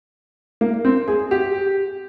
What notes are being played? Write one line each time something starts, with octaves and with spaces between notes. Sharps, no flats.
A#3
C4
G#4
G4